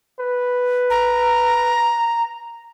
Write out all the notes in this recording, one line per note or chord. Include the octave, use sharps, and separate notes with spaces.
B4
A#5